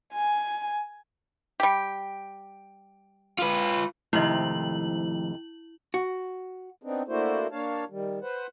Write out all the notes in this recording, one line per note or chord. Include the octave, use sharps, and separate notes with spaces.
G#5
G3 G4
F4 B4
F2 G#2 C3 D#3 F3 A3 E4 F#7
F#4
B3 C4 D4 D#4
A3 A#3 D4 E4 F#4 C5
A#3 D4 C#5 F5 A5
D#3 G3
B4 C5 F#5